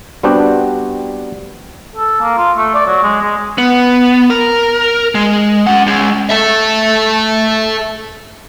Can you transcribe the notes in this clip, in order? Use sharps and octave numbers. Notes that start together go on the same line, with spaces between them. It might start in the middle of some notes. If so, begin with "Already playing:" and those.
G3 B3 C4 D4 F#4 G4
A4
A#3
F4
A3
D5
F#3
G#3
G#3
B3
A#4
G#3
C#4 F#5
G#3 C#4
A4 E5